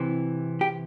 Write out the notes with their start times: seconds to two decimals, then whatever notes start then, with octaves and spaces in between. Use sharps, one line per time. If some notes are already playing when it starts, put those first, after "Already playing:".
Already playing: C3 E3
0.61 G4